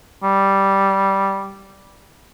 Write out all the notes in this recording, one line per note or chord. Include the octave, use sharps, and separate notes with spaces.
G3